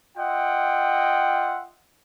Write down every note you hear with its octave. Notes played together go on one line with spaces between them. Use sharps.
F4 D#5 E5 F#5 G5